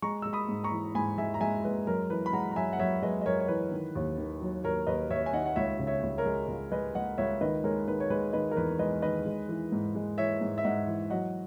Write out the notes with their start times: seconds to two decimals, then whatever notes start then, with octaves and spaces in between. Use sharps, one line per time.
0.02 G#3 A#5 C#6
0.22 G#3 E6
0.33 B5 D#6
0.48 G#2
0.64 A#5 C#6
0.72 E3
0.95 G#2 G#5 B5
1.18 G#3 E5 G#5
1.34 A#5
1.41 G#3 E5 G#5
1.65 G#3 B4
1.87 F#2 A#4
2.10 E3 B4
2.26 B5
2.33 G#3 F#5 A#5
2.51 A#5
2.56 F#2 E5 G#5
2.73 F#5
2.79 F#2 C#5 E5
3.02 G#3 B4 D#5
3.21 D#5
3.26 F#2 A#4 C#5
3.40 C#5
3.48 E3 B4
3.71 D#3
3.95 D#2
4.18 D#3
4.41 F#3
4.64 D#2 A#4 C#5
4.87 D#2 B4 D#5
5.10 D#2 C#5 E5
5.26 G#5
5.33 D#3 D#5 F#5
5.46 F#5
5.56 C#2 C#5 E5
5.79 C#3
5.87 C#5 E5
6.03 C#2
6.18 A#4 C#5
6.26 G#3
6.48 C#2
6.72 G#3 B4 D#5
6.95 G#3 D#5 F#5
7.18 C#2 C#5 E5
7.41 D#3 B4 D#5
7.64 G#3 A#4 C#5
7.88 D#3 B4
8.00 C#5
8.10 G#3 B4
8.33 D#3 B4 D#5
8.51 A#4
8.56 E2 B4
8.79 G#3 B4 D#5
9.02 D#3 B4 D#5
9.26 G#3
9.49 E3
9.72 G#2
9.95 G#3
10.18 E3 C#5 E5
10.41 G#2
10.58 E5
10.64 G#2 D#5 F#5
10.87 E3
11.10 F#3 D#5 F#5